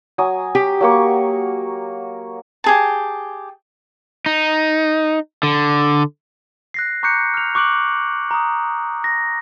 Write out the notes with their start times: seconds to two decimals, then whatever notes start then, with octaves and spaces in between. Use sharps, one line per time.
0.18 F#3 G#5 D#6
0.55 G4
0.81 F#3 A#3 C#6
2.64 G4 G#4 A5
4.26 D#4
5.43 D3
6.74 F#6 A#6 C7
7.03 A#5 C#6 D6 F#6 G6 C#7
7.34 F6 F7
7.55 C#6 D6 F#6 D7 F#7
8.31 A#5 D#6
9.04 A#6